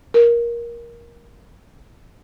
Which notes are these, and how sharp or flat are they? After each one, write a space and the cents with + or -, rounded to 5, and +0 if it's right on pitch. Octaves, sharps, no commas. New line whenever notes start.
A#4 +15